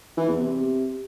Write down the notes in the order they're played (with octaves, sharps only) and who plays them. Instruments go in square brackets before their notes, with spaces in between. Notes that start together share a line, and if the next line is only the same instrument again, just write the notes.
[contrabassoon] E3
E2
C3